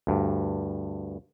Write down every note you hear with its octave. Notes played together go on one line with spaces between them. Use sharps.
D2 G2